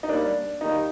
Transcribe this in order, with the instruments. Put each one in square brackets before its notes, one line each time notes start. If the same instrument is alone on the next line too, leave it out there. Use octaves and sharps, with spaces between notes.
[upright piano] D#4
[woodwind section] D#2 D#3 G3 A#3 [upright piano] D4
[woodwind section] D#2 D#3 G3 A#3 [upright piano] D#4